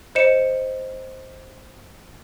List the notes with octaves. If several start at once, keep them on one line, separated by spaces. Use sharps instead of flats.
C5 D#5 C#7 E7